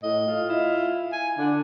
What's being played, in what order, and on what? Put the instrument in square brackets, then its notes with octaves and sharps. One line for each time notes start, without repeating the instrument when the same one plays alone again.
[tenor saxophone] A2 [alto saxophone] D#5
[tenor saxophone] F4
[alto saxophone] E4
G#5
[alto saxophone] D3 [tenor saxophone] D4